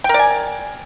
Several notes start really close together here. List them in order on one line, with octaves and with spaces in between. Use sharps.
G5 A#4 D5 G#5